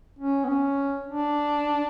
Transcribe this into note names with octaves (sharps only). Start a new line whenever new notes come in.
C#4
B3
C#4
D4